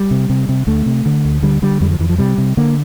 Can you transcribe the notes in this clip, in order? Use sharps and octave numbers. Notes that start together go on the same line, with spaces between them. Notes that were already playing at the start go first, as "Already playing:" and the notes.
Already playing: G3
C3
C3
C3
D2 A3
C3
D3
D2
D3 G3
D3 G3
F2 G3
F3
F2 E3
F3
C3 G3
C3
D3 A#3